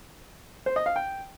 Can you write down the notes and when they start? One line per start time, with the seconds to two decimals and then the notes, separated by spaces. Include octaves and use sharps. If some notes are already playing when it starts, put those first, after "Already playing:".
0.66 C5
0.76 D#5
0.86 F5
0.96 G5